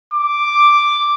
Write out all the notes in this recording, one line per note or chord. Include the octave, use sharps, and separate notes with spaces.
D6